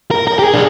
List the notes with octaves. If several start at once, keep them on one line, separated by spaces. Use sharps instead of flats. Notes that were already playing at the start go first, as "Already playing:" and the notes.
A#4
A#4
G4
G#4
D4